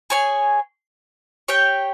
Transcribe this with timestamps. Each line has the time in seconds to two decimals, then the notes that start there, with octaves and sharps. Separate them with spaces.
0.10 G#4 C#5 G#5
1.48 G4 C#5 G5